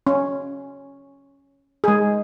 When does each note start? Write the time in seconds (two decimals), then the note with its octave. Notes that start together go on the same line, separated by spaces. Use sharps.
0.07 C#4
1.84 G#3 G#4